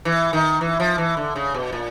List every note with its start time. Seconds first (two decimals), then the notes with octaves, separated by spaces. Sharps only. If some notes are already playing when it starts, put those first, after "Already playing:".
0.05 E3
0.33 D#3
0.61 E3
0.80 F3
0.98 E3
1.17 D3
1.36 C#3
1.54 B2
1.72 A#2